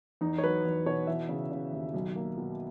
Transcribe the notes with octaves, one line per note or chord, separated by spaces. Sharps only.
E2 D#4
C#5
F#3 B4
E2
B2 C#5
E3 E5
C#3
C#3
D#2
B1
A#3
B2